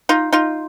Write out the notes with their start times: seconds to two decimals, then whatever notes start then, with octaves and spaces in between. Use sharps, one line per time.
0.09 D#4 F4
0.33 D#4 F4